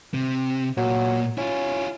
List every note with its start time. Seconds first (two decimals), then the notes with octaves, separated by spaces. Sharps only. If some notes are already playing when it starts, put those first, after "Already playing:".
0.14 C3
0.77 A#2 F#3
1.38 C#4 E4 F4